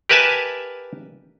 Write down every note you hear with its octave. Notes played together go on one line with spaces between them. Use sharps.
G4 A#4 B4 E5 G#5 A5